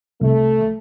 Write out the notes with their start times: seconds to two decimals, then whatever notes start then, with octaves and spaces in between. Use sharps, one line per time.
0.21 C2 A3